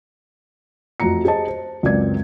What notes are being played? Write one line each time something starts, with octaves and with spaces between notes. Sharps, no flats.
F2 A3 F#4 A#5 C#7
G4 G#4 C5 D#5 A5
C5
C#2 F#2 C4 D5 G#6